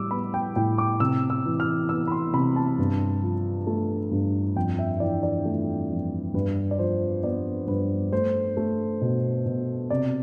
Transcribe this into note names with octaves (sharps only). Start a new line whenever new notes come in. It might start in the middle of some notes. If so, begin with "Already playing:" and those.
Already playing: A2 G3 D6 E6
B3 B5
G5
A2 G5
D6
C3 E6
E6
E3
F6
B3 E6
B5
C6
C3 B5
A5
G2
F3
A3
G2
F2 G5
E5
E3 D5
D5
A3
F2
G2 B4
D5
F3 C5
B3 D5
G2 B4
A3 C5
A3
B2
B2
C3 D5